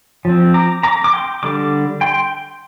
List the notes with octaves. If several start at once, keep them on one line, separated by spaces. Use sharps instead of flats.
F3 C4
A#5 D6
A#5 D6
D6
G5 C6
D3 G3 D6
G5 C6